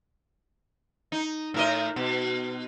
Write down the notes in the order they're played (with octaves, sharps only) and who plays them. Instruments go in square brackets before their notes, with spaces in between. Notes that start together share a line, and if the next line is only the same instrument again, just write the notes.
[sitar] D#4
A2 A#4 D#5
B2